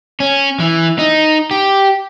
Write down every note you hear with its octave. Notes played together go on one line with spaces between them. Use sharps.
C#4
E3
D#4
G4